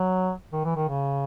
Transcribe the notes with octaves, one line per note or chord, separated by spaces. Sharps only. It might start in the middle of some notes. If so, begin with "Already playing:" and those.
Already playing: F#3
D#3
E3
D#3
C#3